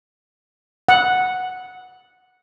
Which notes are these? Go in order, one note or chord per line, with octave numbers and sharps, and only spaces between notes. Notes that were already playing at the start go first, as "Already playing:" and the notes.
F#5